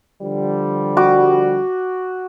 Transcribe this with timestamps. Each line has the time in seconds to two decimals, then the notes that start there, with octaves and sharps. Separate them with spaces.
0.21 D3 F3 G3
0.97 F#4 D6